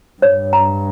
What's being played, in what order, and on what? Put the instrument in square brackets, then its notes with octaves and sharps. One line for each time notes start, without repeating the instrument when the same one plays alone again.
[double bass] G2 [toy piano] C#5
[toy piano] A#5